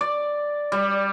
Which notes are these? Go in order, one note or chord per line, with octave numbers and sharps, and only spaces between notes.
D5
G3